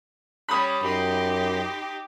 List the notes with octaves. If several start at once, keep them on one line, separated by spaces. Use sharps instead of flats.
G3 C#4 C#5 B5 D#6
F#2 D#4 G4 G5 C6